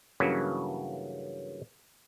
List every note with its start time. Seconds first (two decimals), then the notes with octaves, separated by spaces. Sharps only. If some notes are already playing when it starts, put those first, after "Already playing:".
0.20 G2 C#3 E3 F#3 A#3 C#4